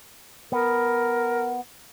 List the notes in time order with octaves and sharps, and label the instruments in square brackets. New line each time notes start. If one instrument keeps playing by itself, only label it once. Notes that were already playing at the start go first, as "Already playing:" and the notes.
[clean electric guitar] B3 [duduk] A#4